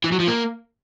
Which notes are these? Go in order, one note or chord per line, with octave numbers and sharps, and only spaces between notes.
E3
F#3
F3
A#3